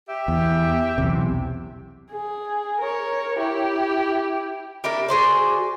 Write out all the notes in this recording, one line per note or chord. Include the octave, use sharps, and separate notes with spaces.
G4 E5
E2
B1 E2 C3
G#4
A#4 C#5
E4 G4
A#3 D4 E4 G4
F#4 G#4 C5 D5